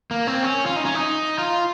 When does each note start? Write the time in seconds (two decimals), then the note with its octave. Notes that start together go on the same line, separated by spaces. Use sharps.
0.11 A#3
0.27 C4
0.43 C#4
0.66 F4
0.76 D#4
0.85 C#4
0.95 D#4
1.38 F4